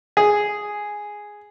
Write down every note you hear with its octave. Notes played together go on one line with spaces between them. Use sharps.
G#4